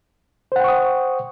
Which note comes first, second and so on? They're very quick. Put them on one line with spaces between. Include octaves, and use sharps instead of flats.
C5 F#5 G5 C#6 D#6